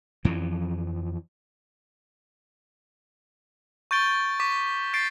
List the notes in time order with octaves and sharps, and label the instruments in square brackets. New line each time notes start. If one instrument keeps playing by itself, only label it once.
[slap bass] F2 E3 F3
[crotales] C#6 G6 A6 D7 G7
C#6 D6 B6
G6 A6 C7 D7